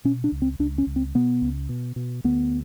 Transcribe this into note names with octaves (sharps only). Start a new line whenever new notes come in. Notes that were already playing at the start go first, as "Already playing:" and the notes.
B2 C#4
D4
C#2
C4
C#2 D4
C#4
C#2
C4
B2 B3
C#2
B2
B2
D2 B3